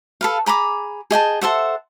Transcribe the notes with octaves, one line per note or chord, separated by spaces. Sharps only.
A4 B4 F5
G#4 A#5 B5 D6
G#4 D#5 G5 A5
A4 C5 E5 F#5